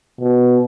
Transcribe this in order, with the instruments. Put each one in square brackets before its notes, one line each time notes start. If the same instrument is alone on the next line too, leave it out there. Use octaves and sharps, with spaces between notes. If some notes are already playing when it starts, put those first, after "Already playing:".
[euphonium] B2